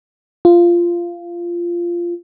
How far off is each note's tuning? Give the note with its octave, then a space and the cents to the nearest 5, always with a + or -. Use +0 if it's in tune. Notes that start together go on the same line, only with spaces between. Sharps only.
F4 -15